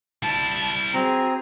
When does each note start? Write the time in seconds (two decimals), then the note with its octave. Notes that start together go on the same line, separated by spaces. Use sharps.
0.23 G3 E4 A5
0.94 C4 F#4 G#4 A#5